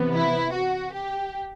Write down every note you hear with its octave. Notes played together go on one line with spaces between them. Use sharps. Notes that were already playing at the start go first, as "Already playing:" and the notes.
Already playing: C3 E3 B3
E4
F#4
G4